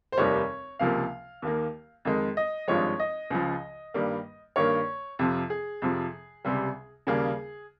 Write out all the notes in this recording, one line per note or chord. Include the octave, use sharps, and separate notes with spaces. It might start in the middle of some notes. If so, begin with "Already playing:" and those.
C5
F1 D#2 D#3 G3 C#5
C#2 C3 F3 A#3 F5
D#2 D#3 A#3
F2 D#3 G#3
D#5
G#1 G2 F3 G#3 C#5
D#5
C#2 C#3 F3
G2 D#3 G3 A#3
G2 D#3 A#3 C#5
F2 C3 F3
G#4
F2 C3 F3
C#2 C3 G3
D#2 C#3 G3 A#3 G#4